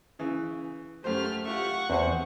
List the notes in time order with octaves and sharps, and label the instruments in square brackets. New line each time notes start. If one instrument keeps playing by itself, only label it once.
[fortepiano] C#3 E3
[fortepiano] F#2 G4 C5 [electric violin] A3 F6
[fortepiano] F4 G4 E5 [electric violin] F#5 C#6
[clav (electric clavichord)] E2 [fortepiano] C3 C5 G#5